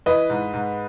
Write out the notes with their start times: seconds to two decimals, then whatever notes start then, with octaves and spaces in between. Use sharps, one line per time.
0.06 E3 B4 D#5
0.30 G#2
0.53 G#2